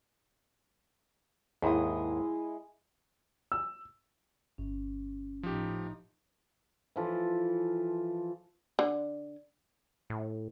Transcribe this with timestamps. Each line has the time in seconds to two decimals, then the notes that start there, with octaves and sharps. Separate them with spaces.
1.62 D#2 G#2 G#3 E4 D#6
3.52 E6
4.58 G1 C#4
5.43 A2 F3 D#4 G4
6.96 E3 F3 A4
8.79 D3
10.10 A2